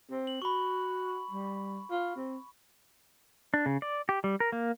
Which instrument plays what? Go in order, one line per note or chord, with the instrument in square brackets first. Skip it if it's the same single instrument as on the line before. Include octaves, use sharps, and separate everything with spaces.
[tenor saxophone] C4
[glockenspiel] F#7
[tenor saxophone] F#4 [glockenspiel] B5 C#6
[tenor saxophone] G3
F4
C4
[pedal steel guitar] D4
C#3
D5
G4
G3
A#4
A#3